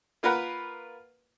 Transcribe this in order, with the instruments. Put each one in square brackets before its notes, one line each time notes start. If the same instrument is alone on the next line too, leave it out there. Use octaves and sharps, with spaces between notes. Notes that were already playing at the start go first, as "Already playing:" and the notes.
[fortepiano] A#3 F4 A#4 B4 F#5